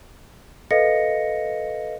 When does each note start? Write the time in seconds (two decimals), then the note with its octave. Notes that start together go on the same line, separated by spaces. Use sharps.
0.71 A4 B4 D#5 F5 A#6 C#7